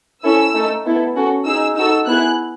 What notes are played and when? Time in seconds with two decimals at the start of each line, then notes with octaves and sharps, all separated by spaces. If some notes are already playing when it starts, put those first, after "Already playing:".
0.24 C#4 E4 A4 E6
0.55 A3 D#4 A4
0.85 B3 E4 A4
1.15 C#4 F#4 A4
1.45 D#4 G#4 E6
1.75 D#4 F#4 A4 E6
2.06 B3 E4 G#4 F#6